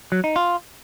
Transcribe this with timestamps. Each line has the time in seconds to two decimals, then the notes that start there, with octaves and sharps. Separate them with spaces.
0.12 F#3
0.24 D#4
0.36 F4